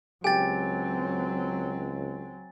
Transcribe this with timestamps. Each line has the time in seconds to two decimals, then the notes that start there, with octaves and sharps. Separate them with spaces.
0.24 C#2 F#3 C4 G4 G5 G#5 A6